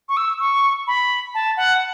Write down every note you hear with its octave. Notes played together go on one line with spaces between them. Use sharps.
C#6
E6
C#6
B5
A5
F#5